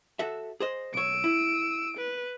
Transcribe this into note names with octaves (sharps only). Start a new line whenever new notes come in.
F#4 A4 E5
G#4 C5 D#5
B1 C#5 E6 D7
E4
B4